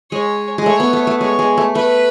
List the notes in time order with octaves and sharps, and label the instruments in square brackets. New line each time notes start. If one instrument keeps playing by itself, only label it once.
[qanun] G#3 [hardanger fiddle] C#5
[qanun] G#3
[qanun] A3 [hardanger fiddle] C#5
[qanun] B3
A3
A3
[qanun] G#3 [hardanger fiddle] C#5
[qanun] G#3
A3
[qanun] A3 [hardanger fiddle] B4